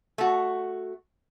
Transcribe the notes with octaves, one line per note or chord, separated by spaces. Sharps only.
A3 F#4